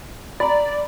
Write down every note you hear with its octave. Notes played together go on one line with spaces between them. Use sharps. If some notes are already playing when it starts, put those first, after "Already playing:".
D5 A#5 B5